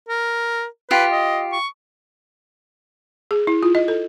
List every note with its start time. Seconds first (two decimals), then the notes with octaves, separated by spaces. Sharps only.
0.09 A#4
0.91 F4 G4 B4
1.12 D#5
1.53 C#6
3.31 G#4
3.47 E4
3.63 F4
3.75 D#5
3.88 A4